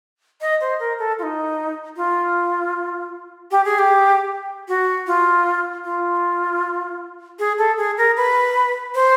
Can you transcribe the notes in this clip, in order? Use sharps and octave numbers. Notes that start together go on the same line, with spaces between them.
D#5
C5
A#4
A4
F4
D#4
F4
G4
G#4
G4
F#4
F4
F4
G#4
A4
G#4
A#4
B4
C5